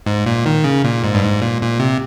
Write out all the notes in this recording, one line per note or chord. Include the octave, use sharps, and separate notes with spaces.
G#2
A#2
D#3
C#3
A#2
G#2
G2
G#2
A#2
A#2
C3